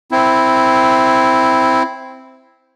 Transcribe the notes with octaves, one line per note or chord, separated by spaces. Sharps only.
C4 E4